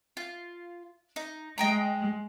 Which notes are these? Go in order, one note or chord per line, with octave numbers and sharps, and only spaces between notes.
F4
D#4
G#3 D#5 G5 A#5